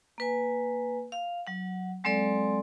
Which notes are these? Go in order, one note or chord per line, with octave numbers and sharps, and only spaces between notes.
A#3 B4 G#5
F5
F#3 F#5
F#3 G#3 C4 A4 D5 C6